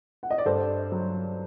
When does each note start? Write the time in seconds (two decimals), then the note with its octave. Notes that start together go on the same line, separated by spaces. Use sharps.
0.23 F#5
0.30 D#5
0.38 D5
0.45 G2 A4 C5
0.92 F#3